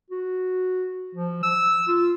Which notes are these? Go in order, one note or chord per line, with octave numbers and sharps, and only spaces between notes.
F#4
F3
E6
F4